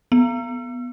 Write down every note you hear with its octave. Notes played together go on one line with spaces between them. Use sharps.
B3